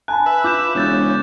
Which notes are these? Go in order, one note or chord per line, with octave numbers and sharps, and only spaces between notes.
G#5 A5 B5 F#6
B4 E5
F4 D6 G6 E7
E1 C#3 G6 A6 E7